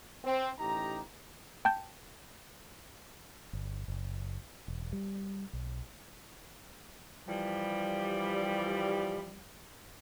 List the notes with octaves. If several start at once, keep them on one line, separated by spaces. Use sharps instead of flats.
C4
A1 D#4 G4 A#5
G5 A5 G6
G1
F#1
E1
G3
B1
E3 F3 G3